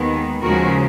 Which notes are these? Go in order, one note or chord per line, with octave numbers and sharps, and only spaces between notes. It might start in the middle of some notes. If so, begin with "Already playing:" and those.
Already playing: D#2 D#3 G#3 B3
D#2 C#3 F3 G#3 F#4 A#4